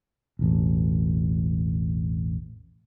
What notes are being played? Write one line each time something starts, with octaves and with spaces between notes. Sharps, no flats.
E1 A1